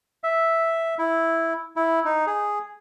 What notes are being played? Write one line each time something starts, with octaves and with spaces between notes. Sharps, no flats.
E5
E4
E4
D#4
G#4